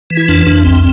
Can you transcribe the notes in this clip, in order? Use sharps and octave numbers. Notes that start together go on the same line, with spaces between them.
E3
E4
F2 D4
F2 D4
C2 C4